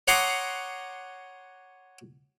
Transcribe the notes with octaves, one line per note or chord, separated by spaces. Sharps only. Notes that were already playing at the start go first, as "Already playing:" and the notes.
C#5 F#5 A#5 C6 D6 D#6